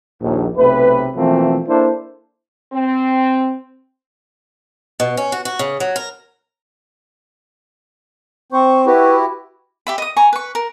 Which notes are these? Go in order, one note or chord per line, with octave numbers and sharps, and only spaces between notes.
A#1 D#2
B1 C3 A3 B4
B2 E3 F3 A3 A#3 C4
A#3 D4 E4 A4 C5
C4
B2
C#4
F#4
F#4
C#3
F#3
A#4
C4 C5 C#6
E4 F#4 G4 B4
G4 E5 B5
D#5 D#6
G#5 A#5 C#6
B4 C#6
A#4